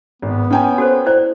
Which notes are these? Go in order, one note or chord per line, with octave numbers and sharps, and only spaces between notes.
G#1 B3
C#4 G5 G#5
F#4 A4 C5
E4 C5 D5